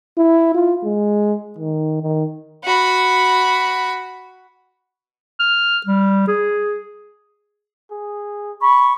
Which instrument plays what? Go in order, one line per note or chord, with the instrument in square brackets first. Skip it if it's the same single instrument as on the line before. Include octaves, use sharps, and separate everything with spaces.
[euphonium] E4
F4
G#3
D#3
D#3
[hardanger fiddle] F#4 B5
[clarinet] F6
G3
G#4
[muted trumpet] G#4
[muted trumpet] B5 [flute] C#6